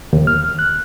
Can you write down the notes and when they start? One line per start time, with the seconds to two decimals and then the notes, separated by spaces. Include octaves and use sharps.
0.13 D#2
0.27 F6
0.59 F#6